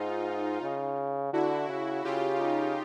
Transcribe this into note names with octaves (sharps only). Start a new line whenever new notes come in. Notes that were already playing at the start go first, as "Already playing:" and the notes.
Already playing: G#2 D#4 F4
C#3
D3 E4 F#4
C#3
C#3 F4 G4
D#4